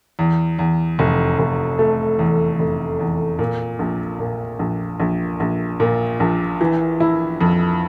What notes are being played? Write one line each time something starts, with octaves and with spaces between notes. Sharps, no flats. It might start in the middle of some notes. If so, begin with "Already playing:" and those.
E2
E2
F1
F1
A3
E2
F1
E2
A#2
A#1
A#2
A#1
A#1
A#1
A#2
A#1
E3
E4
F2